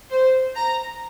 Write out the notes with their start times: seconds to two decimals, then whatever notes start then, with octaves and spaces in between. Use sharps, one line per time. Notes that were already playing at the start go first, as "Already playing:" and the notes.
0.11 C5
0.55 A#5